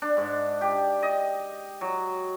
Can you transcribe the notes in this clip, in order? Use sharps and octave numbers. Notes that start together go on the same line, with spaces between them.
D4
G#2
G4
D#5
F#3